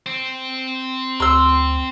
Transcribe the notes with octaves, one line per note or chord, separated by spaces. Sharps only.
C4
D2 C6 E6